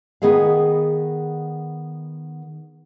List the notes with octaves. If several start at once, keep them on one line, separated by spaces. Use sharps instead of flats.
D#3 B3 G#4 D#5 F5